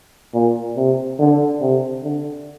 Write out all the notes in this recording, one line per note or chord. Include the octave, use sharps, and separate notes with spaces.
A#2
C3
D3
C3
D3